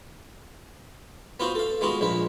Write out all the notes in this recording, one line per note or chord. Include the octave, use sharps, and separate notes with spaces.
B3 F4 F#4 C5
A4 F5
G#3 B3 F4 F#4
A#1 G#3 B4